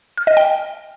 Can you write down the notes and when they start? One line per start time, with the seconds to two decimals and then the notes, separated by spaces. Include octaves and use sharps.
0.18 F6
0.27 D#5
0.37 G5